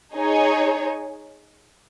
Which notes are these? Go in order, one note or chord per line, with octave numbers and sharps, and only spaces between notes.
D#4 G#4 C#5